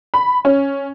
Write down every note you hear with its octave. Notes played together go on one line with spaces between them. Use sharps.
B5
C#4